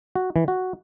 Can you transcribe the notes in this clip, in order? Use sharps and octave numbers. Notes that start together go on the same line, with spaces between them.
F#4
E3
F#4